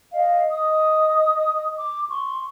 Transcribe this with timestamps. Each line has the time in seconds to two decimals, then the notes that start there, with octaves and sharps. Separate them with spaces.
0.13 D#5 F5
0.50 D#5 D#6
1.78 D6
2.09 C6 C#6